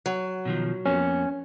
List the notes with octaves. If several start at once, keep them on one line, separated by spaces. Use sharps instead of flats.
F#3
B2 D#3 F3
F2 A#3 B3 C#4